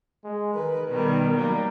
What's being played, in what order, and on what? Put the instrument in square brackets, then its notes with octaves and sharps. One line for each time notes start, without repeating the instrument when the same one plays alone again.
[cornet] G#3
[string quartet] D#3 B4 [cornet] A#4
[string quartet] B2 D#3 G3
F#3 G3 A#3